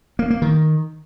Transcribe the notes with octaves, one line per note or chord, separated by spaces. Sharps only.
A#3
A#3
D#3